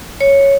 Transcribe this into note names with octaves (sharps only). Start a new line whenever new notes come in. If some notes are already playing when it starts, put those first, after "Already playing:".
C#5